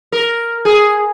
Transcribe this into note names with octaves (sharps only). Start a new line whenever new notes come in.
A#4
G#4